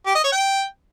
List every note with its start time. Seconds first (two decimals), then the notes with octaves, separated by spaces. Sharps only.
0.06 G4
0.15 D#5
0.24 C#5
0.32 G5